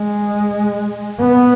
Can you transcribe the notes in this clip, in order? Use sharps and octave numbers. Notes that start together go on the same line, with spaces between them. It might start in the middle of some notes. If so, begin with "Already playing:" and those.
Already playing: G#3
B3